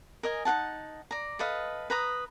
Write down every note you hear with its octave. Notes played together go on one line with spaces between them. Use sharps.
A#4 D#5 G#5
D#4 G#4 F#5 A5
D5 A#5
A4 B4 D#5 F5
B4 A#5 D#6